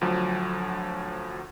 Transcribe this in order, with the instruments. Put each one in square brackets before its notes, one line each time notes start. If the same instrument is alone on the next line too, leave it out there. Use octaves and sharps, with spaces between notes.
[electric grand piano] D2 F3 F#3